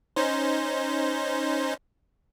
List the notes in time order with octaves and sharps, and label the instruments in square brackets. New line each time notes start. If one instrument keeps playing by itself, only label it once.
[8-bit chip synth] C#4 D#4 C5